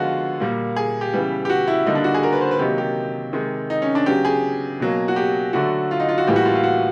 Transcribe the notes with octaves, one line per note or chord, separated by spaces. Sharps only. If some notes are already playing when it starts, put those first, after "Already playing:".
Already playing: D3 F3 G#3 B3 F4 F#4
A#2 G3 A#3
G#4
G4
C#3 E3 G3 B3
G4
F#4
E4
D3 G3 A#3 D#4
D4
F#4
G#4
A#4
B4
C5
B4
C3 D#3 F#3 A#3 G4
G4
C3 D#3 G#3
D#4
C#4
D4
C#3 F#3 B3 G4
G#4
B2 F#3 A#3
F#4
G4
D3 F#3 A3 F#4
F4
D#4
F4
F#4
A2 E3 G3 A#3 G4
F#4
F4
F4
F#4